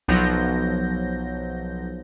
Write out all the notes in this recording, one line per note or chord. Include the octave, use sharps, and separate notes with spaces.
B1 F3 F#3 G6 A#6